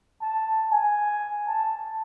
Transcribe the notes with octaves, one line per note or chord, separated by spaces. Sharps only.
A5
G#5
A5